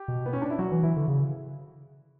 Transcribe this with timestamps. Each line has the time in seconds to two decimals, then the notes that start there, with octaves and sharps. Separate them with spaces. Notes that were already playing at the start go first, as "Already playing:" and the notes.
Already playing: G4
0.08 B2
0.26 B3
0.33 C#4
0.42 D4
0.50 E4
0.59 F#3 F#4
0.72 E3
0.83 E3 E4
0.97 D3
1.08 C#3